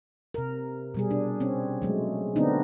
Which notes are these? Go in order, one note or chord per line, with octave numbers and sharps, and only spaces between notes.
C3 A#4
B2 G3 G#4
D4
C4 C#4
F#3 G#3 A3
D3 A3 B3 C4 D4 D#4